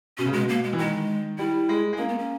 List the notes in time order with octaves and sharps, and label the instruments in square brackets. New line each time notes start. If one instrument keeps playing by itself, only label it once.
[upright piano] B2 [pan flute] C#4
[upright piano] C#3
[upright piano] B2 [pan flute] G#3
[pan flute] A#3
G#3
[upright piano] E3
[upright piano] D#3 [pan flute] G#3
[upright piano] G3 [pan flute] E4
[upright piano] G#3
G#3
[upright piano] A#3 [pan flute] C#4
[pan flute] B3
C#4